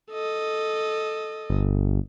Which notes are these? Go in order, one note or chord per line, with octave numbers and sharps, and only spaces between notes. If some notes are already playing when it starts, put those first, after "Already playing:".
A4 D#5
G1